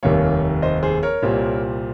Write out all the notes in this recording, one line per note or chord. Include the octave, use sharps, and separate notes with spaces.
F1 D#2 D#3 G3 A#3 C#5 F5
C5 D#5
G#4 C5
A#4 C#5
C2 A#2 G3 C4